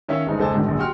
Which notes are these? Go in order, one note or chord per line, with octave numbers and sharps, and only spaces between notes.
D#3 C#4 C#5 E5 F5
G1 G#3 D#4 C5
E1 C#2 A4 C5 G#5 A5
G#2 B2 D3 D#3
D1 A#1 F#2 D3
F#4 G4 G5 C6 F6